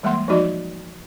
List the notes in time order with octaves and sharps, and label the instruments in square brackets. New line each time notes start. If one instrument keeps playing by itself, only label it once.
[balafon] E3 G3 G#3 A#3 F#5 C6
F3 G#3 D#4 F#4 D5 D#5